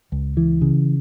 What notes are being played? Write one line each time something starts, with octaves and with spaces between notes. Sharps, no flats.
C#2
E3
C#3